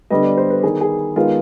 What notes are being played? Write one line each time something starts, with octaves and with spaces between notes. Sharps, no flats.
D3 G3 B3 D#5
D5
C5
B4
D#3 B3 G#4
G#4
D#3 G#3 B3 F4